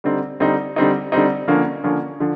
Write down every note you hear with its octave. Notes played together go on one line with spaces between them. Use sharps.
D3 G3 C4 D#4
D3 G3 C4 D#4
D3 G3 C4 D#4
D3 G3 C4 D#4
D3 F3 A#3 C#4
D3 F3 A#3 C#4
D3 F3